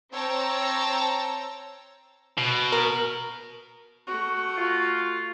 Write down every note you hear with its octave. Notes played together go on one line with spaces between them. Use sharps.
C4 C#5 G5 A5 A#5 E6
B2
A#4
A3 F#4
F4